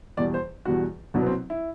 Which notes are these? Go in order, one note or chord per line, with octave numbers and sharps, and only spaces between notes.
E2 B2 G3 D5
C5
E2 B2 G3 F#4
C2 B2 F#3 D4
B3
C4
E4